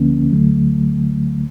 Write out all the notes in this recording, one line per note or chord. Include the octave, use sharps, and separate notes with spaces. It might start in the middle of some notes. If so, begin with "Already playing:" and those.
Already playing: D2 D3 F3 A#3 C#4
D2 D3 F#3 A3